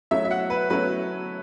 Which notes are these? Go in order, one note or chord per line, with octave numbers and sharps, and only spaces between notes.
F#3 A3 C#4 E4 E5
E5
F#5
B4
F#3 A3 C#4 E4 B4